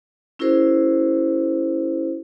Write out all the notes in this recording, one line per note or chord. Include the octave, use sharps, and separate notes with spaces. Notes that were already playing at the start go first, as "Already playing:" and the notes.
C#4 E4 F#4 G#4 A#4 C5